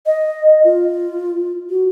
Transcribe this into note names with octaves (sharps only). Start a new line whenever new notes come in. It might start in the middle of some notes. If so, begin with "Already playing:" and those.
D#5
F4
F#4